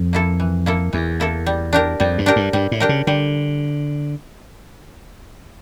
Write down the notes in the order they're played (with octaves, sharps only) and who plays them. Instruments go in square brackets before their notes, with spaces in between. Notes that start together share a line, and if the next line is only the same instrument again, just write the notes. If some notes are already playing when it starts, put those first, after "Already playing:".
Already playing: [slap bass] F2
[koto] A#3 E4 A4
E3
A#3 E4 A4
[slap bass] E2 [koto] E3
[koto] A#3 E4 A4
G3
D4 G4 A#4
[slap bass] F2 [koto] G3
[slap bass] G2
[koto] D4 G4 A#4
[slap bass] G2
[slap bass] G2 [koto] G3
[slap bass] A2
[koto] D4 G4 A#4
[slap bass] C#3
[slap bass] D3 [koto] G3